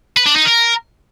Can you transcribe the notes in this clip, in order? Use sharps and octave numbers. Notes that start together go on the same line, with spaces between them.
B4
D4
D#4
A#4